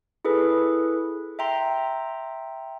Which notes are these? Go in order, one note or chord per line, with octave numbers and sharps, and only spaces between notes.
E4 G#4 A4 B4
E5 G5 A#5 C6